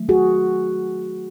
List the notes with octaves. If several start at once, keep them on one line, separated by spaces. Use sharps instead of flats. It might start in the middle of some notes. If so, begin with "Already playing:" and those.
Already playing: D#3 F#3 A3
F#4 G#4